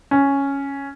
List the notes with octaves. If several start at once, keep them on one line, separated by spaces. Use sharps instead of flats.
C#4